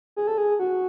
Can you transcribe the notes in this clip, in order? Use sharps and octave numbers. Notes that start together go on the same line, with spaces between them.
G#4
A4
G#4
F#4